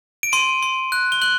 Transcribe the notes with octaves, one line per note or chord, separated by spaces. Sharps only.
D7
C6 D#7
C6
F#6
G7
F#6 F#7